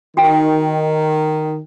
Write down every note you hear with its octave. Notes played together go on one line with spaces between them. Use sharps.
D#3 F#4 G5